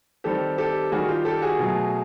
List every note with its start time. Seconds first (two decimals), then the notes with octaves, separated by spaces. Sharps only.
0.24 D#3 G3 C4 G4 A4
0.58 G4 A4
0.92 D#3 G3 A#3 F#4 G#4
1.08 F4 G4
1.25 G4 A4
1.42 F#4 G#4
1.59 B2 F#3 A3